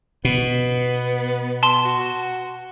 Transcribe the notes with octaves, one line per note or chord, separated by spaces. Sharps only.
B2 B3
A5 C6
F#4